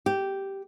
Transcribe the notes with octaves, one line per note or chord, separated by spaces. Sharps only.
G4